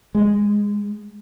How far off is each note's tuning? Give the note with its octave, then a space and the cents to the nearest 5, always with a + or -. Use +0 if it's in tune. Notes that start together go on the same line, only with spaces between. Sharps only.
G#3 -15